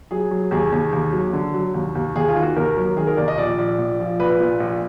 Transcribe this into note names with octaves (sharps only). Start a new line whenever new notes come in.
F#3 G#4
F#3
D#2 G#4
D#2
D#2
F#3
D3
F#3
D#2
D#2
D#2 G#4
F4
D#3
F#4
D#2 A#4
F#3
D#3 G#4
A#4
D#2 D5
D#5
A#1 D5
A#1
A#1
F3
A#1 B4
A#2
A#1